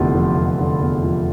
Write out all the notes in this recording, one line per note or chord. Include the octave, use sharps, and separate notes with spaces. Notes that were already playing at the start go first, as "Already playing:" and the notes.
Already playing: F1 E2 D3 F3 E4 F4
F3
F1
D3
E2
F3